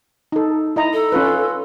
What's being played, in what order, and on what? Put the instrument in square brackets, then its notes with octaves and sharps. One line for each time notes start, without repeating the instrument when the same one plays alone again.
[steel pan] D#4 A4
E4 D#5 A#5
[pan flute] A4
[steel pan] C#4 F4 B4